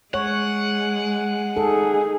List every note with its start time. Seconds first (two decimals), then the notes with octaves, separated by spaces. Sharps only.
0.14 G#3 C#5 F#5
1.57 D#4 G#4 A4